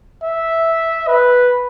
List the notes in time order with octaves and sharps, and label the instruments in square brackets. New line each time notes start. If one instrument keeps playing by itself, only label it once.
[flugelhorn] E5
B4